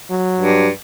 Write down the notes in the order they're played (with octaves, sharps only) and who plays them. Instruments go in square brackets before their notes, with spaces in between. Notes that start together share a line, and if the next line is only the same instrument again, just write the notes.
[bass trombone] F#3
[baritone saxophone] G2